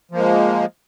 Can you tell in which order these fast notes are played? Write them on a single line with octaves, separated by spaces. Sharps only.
F3 A#3 G#3